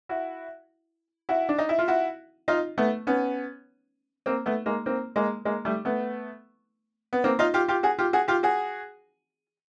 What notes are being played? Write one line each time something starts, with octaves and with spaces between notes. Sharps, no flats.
E4 F#4
E4 F#4
D4
D#4
E4
F4
E4 F#4
D#4 F4
A3 B3
B3 C#4
A#3 C4
A3 B3
G#3 A#3
A#3 C4
G#3 A#3
G#3 A#3
G3 A3
A3 B3
B3
A#3 C4
D#4 F4
F4 G4
F4 G4
F#4 G#4
F4 G4
F#4 G#4
F4 G4
F#4 G#4